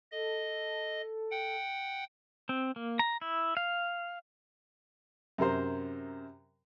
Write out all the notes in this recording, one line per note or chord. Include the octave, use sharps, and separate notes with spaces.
A4 D#5
F#5 G5
C4
A#3
A#5
E4
F5
F#2 C3 A#4 C5